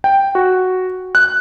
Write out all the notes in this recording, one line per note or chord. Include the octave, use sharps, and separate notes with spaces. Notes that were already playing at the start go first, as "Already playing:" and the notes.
G5
F#4
F#6